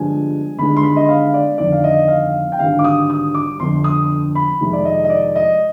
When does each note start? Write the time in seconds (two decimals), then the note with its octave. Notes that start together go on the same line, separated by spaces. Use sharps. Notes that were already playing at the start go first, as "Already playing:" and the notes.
Already playing: G1 G2 F3 G#3 G#5
0.58 G1 G2 D#3 G#3 B5
0.77 C6
0.83 B5
0.96 D#5
1.09 F5
1.34 D5
1.58 G1 F2 D#3 D5
1.72 F5
1.84 D#5
2.08 F5
2.52 G5
2.59 G#1 G2 D3 G3 F5
2.79 D6
2.84 D#6
3.10 D#6
3.35 D6
3.59 G1 F2 D3 C6
3.84 D#6
4.35 B5
4.60 F2 C3 D#3 G#3
4.73 D5
4.85 D#5
5.04 D#5
5.10 D5
5.36 D#5